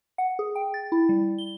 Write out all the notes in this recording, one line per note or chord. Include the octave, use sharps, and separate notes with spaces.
F#5
G#4
G5
A6
E4
G3
G7